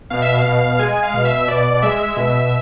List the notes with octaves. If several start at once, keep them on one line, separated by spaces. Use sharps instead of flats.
B2 F5
E5
F5
B2
G#3 G#5
F5
B2
E5
B2 D5
G#3 E5
B2